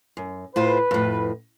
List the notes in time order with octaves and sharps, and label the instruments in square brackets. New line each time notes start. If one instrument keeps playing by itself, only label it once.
[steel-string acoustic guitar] F#2
[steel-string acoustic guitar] A2 F4 C5 [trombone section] B4
[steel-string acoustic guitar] F2 A2